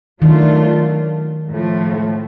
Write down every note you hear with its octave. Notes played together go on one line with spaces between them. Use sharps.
D#3 F#3 A3 D4 F4
A2 F3 A3